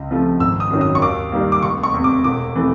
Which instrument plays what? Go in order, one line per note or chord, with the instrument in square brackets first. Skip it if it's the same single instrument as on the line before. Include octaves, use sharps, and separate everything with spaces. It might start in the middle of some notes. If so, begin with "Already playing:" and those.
Already playing: [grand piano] C#2
C3 F3 A3
G#1 E6
D#6
F#2 D#3 F#3
D#6
C#6
D#2 D6
D#3 G3 A#3
D6
F1 C#6
C#6
E2 C3
D6
E1 D6
C3 E3 A3